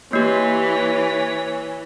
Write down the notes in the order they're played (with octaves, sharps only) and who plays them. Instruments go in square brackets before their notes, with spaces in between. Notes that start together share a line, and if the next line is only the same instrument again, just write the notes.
[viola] E3 [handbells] A#3 G4 [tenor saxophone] C#5